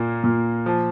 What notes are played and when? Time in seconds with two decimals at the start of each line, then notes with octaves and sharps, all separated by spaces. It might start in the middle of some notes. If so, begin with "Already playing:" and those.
Already playing: A#2 A#3
0.24 A#2
0.66 F3